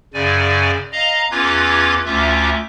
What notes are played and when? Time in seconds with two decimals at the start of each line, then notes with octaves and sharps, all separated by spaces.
0.14 F#2 C#3 D5 G#5
0.92 D#5 F5 A#5
1.31 E2 C#4 F4 B4 D6 G#6
2.05 D2 C#4 F4 E5 D6